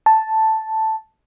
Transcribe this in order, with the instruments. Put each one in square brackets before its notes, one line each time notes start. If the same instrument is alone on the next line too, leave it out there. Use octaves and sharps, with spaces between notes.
[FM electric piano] A5